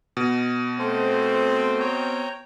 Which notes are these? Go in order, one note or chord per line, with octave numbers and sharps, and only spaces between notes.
B2
A3 C4 A4 C5
C#5 G5 A#5